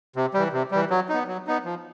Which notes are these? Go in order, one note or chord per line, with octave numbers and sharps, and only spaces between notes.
C3
E3 G3
C3
E3 G3
F#3
B3 D#4
F#3
B3 D#4
F3